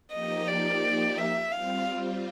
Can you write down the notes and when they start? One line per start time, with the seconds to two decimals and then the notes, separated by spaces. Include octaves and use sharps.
0.12 F3 A#3 D#4 G4 D#5
0.48 D5
1.18 E5
1.52 G3 C4 F4 F5